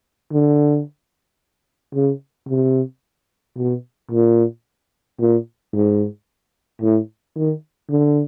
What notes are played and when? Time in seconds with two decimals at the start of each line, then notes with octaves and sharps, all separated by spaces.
0.32 D3
1.94 C#3
2.49 C3
3.57 B2
4.11 A#2
5.20 A#2
5.73 G#2
6.82 A2
7.36 D#3
7.90 D3